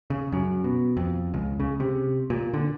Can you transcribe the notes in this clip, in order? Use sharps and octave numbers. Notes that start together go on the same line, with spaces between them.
C#3
F#2
B2
F2
C#2
C#3
C3
A#2
D3